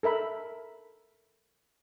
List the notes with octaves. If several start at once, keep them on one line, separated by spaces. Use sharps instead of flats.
A4 A#4 E5 B5